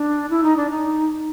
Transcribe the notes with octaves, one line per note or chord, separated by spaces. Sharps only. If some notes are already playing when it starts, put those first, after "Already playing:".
Already playing: D4
E4
D#4
D4
D#4